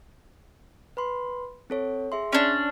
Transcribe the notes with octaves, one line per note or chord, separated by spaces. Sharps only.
B4 B5 C6
C4 A4 C#5
G#4 E5 C6
C#4 D4